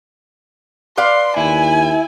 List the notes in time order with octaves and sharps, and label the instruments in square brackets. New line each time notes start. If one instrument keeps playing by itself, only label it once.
[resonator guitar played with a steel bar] B4 D5 F5 [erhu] C6
[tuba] D#2 [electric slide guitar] E4 [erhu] G#5